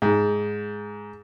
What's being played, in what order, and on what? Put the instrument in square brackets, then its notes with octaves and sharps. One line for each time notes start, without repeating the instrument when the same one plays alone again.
[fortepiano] G#2